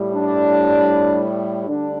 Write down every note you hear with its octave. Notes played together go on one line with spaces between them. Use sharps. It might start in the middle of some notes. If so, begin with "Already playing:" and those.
Already playing: A2 G3
D4
D2 D3 G3 D4